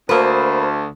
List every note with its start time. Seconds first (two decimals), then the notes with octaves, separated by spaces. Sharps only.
0.09 D2 A#3 B4 C5